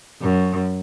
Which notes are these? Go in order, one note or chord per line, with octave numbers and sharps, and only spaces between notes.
F#2